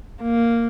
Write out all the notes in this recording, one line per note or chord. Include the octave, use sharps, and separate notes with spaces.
A#3